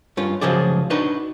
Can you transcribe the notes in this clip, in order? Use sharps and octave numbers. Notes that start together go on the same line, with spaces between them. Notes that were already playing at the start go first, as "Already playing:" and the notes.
G2 C#4 F4
F#2 C#3 F3 G#4 D5
D4 D#4 F#4 B4